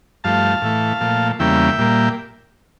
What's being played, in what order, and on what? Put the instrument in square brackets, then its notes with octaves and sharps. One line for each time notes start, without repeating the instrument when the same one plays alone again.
[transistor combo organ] G2 F3 A3 F5 A5
A2 E3 A3
A#2 F3 A3
E2 C#3 G3 A#3 E5 G5
A#2 G3 A#3